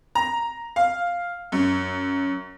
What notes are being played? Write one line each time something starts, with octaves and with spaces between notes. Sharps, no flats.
A#5
F5
F#2